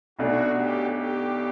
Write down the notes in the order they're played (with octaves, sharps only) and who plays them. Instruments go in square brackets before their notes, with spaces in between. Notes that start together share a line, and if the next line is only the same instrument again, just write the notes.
[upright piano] B1 B2 A3 D4 [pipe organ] F#4
[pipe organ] G4
G4